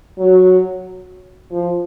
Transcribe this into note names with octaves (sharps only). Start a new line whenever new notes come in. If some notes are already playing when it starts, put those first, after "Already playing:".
F#3
F3